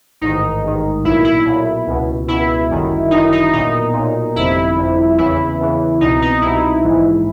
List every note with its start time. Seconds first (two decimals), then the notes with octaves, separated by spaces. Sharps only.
0.21 A1 G#2 D#3 D#4
0.64 A1 G#2 D#3
1.04 B1 A#2 E4
1.25 E4
1.46 B1 A#2
1.87 C#2 B2
2.28 C#2 B2 E4
2.70 G1 F#2 D#3
3.11 G1 F#2 D#3 D#4
3.32 D#4
3.53 B1 A#2 D#4
3.94 B1 A#2
4.35 G1 F2 C3 E4
4.77 G1 F2 C3
5.18 E2 C#3 E3 E4
5.60 E2 C#3 E3
6.01 C2 B2 D#4
6.22 D#4
6.42 C2 B2 E4
6.84 A#1 G#2 E3